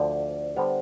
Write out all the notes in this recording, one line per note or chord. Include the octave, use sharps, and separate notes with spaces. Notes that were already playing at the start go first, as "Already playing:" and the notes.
Already playing: D2 D3 F3 D5
D3 G3 B3 C5